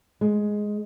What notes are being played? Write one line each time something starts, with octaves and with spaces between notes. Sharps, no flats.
G#3